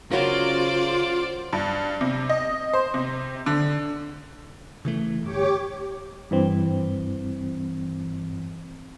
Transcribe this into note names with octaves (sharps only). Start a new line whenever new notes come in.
C#3 F#3 F4 A#4 C5 D5
G2
C3
D#5
C5
C3
D3
C#3 E3 A3
G1 G4 C#5 D6
G2 E3 C4